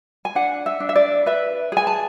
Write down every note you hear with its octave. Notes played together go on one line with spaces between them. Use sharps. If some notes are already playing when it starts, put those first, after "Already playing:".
G#5
D4 F#5
E5
D4
E5
D5
B4 E5
G#4 G#5
A5